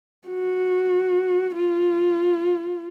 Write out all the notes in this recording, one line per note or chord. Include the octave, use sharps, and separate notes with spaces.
F#4
F4